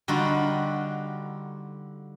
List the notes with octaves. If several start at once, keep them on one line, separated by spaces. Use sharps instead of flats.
D3 G3 D#4 F4 F#4